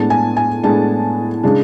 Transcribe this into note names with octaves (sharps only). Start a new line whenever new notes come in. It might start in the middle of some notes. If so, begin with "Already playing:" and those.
Already playing: A2 G#3 B3 D4 A5
G#5
G#5
A2 G#3 B3 D4 A5
C#3 G#3 D4